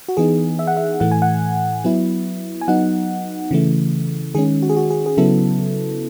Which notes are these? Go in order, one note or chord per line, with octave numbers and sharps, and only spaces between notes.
F#4
E3 B3 D#4 G#4
E5
F#5
E5
A2 E3 A3 F#5
G#5
F#5
F#3 B3 E4
G#5
F#3 B3 D#4 F#5
C#3 E3 A3
D#3 G#3 C#4 G#4
F#4
G#4
F#4
G#4
G#4
C#3 F#3 B3 E4 A4